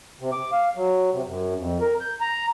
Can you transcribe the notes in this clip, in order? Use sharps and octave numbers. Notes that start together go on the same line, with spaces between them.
C3
D6
F5
F#3
C3
F#2
F2
A#4
G6
A#5